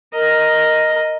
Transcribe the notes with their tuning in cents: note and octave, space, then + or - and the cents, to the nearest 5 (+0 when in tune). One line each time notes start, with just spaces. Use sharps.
A#4 +0 D#5 +0